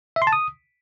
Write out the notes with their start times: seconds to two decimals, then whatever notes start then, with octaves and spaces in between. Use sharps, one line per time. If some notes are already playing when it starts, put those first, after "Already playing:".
0.16 E5
0.22 C6
0.27 A5
0.33 D#6